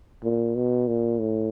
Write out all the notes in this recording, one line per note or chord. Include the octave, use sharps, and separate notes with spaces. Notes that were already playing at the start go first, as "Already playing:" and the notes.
A#2
B2
A#2
A2